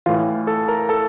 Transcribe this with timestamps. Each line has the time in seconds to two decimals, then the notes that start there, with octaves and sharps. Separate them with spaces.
0.06 A2 E3 F4 F5
0.47 A4 A5
0.68 A#4 A#5
0.89 A4 A5